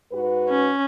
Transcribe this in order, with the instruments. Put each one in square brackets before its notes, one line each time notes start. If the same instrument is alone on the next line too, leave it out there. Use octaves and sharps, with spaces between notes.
[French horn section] G#2 F#4 B4
[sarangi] C#4